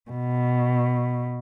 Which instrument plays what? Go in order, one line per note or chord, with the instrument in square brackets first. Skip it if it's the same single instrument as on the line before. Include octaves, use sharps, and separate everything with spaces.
[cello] B2